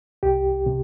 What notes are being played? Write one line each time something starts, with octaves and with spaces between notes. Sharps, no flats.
C2 G4
C3